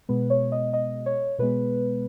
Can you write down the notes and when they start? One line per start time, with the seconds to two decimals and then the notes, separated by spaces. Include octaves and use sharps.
0.09 B2 G#3 B3 B4
0.30 C#5
0.52 D#5
0.73 D#5
1.06 C#5
1.39 B2 G#3 B3 B4